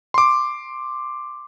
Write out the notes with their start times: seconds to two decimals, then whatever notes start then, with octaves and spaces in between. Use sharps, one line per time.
0.14 C6 D6